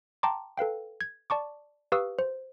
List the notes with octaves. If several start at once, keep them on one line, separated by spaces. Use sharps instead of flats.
G5 A5 A#5 C6 D6
A4 B4 F5 G5
G#6
D5 A5 C#6 D6
G4 B4 F5 C#6 D#6 E6
C5